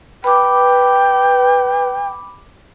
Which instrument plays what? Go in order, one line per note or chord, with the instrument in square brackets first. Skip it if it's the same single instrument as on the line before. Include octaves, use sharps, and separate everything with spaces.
[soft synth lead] B4 [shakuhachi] G5 [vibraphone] B5 D6